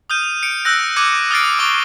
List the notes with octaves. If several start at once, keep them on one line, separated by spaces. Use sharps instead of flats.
D#6 F6 G6 D#7
C#7 D7
E6 F#6 G6 A#6
D6 E6 F#6 G#6 C#7 D#7
D#6 F6 F#6 A6 C7 D7
C#6 D6 G7